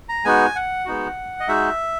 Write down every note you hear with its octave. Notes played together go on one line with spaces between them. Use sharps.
A#5
G#3 B3 D#4 F#4 G#5
F#5
G#3 B3 D#4 F#4
D#5
G#3 D#4 F#4 E5